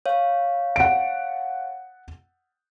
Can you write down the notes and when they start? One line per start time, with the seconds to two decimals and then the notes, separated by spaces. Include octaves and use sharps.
0.06 C#5 F5
0.76 F#5 D7